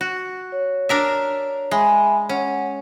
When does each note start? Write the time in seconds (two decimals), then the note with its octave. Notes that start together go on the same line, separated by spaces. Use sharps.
0.01 F#4
0.52 C#5
0.89 D4 A#4 E5
1.71 G#3 E5 G#5 B5
2.29 C#4 F#5